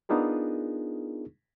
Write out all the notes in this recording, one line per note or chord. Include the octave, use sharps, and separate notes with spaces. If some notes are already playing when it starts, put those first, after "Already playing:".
B3 D4 D#4 F4 G#4 A#4